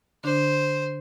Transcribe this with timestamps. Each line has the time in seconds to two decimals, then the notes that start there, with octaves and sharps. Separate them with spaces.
0.24 D3 D4 C5